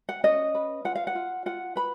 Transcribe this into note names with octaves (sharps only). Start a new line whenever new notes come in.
F#5
C#4 D#5
B4
F4 F#5
F5
F#5
F4
F4 F#5
B4 B5